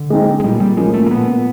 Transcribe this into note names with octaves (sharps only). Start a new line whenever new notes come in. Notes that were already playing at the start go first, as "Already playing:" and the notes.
Already playing: D3
G#3 C4 D#4
G#3
A#2 G3
G3
F3 G#3 A#3 C#4
A3
A#3
A#2 B3